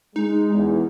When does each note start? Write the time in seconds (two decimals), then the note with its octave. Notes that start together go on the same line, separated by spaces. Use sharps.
0.16 G#3 D#4
0.53 E2